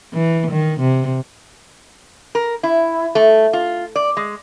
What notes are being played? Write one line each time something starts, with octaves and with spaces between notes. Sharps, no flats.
E3
D#3
C3
A#4
E4
A3
F4
D5
G#3